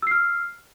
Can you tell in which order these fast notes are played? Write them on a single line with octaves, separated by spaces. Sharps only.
E6 C7 F6